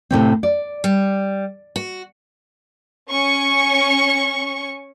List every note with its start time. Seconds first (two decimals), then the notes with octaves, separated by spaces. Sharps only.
0.11 A2 C3 C4
0.43 D5
0.84 G3
1.76 F#4
3.11 C#4 C#6